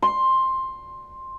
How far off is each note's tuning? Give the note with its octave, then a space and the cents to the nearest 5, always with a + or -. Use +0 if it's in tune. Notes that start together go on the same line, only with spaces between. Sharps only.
C6 +10